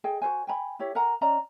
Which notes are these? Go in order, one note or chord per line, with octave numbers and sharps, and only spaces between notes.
G#4 D#5 G5
F#4 B4 C5 G#5
G5 G#5 A#5 B5
E4 G4 C#5
A#4 F#5 G#5 A#5
C#4 D5 D#5 A#5